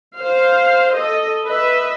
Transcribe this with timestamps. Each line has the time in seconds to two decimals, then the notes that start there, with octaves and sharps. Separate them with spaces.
0.19 C5 F5
0.94 A4 D#5
1.46 B4 D#5 E5